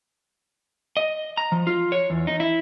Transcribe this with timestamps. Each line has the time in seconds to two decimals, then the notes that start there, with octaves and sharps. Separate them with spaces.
0.97 D#5
1.37 A#5
1.52 F3
1.67 F4
1.92 C#5
2.10 E2
2.27 D#4
2.40 E4